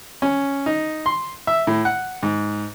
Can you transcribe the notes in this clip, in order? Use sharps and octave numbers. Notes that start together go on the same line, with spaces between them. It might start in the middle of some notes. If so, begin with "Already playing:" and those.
C#4
D#4
C6
E5
A2
F#5
G#2